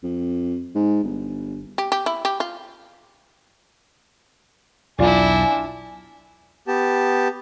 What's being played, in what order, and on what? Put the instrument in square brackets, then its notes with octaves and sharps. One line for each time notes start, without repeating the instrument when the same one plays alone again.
[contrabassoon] F2
G#2
G1
[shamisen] G4
G4
E4
G4
F4
[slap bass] B1 E2 [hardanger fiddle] D4 E4 [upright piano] F4 D5 [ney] G#5
[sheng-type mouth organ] B3 G4 A5